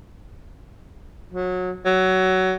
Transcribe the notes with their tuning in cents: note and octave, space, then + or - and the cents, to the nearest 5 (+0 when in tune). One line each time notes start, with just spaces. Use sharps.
F#3 -25
F#3 +15